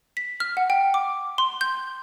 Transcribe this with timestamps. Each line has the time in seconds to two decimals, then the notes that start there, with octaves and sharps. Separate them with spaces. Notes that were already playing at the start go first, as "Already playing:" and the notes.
0.17 B6
0.40 F6
0.57 F#5
0.70 G5
0.94 D6
1.38 C6
1.61 G6